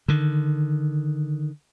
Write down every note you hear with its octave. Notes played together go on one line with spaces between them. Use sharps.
D3 D#3